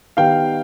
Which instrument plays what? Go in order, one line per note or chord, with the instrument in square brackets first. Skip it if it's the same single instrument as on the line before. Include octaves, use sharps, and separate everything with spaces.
[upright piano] D#3 G3 B3 F5 G5